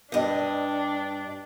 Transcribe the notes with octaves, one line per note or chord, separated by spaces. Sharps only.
G2 D4 D#5